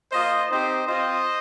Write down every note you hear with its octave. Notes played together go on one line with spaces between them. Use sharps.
A#3 F4 C5 D#5
C4 D#4 G4 C5 D#5
C4 F4 C5 D#5